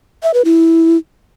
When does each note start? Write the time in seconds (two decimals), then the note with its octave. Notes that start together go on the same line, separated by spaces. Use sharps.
0.23 E5
0.34 B4
0.45 E4